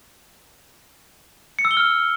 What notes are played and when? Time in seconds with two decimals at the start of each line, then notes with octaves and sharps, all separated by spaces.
1.59 C#7
1.65 E6
1.71 G7
1.77 F6